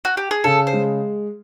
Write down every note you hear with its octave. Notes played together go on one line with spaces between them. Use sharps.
F#4
G4
G#4
C#3 A4
C5
G#3